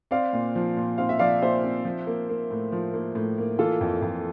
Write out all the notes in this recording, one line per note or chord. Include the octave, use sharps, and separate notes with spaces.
C4 D5 F5
A#2
F3
A#2
C4 F5
E5
F3 D5 F5
A#2 C5 E5
C4
F3
A#3
A#3
A2
F3
A#3
A2
A#3
E3 F4 A4
F2
F2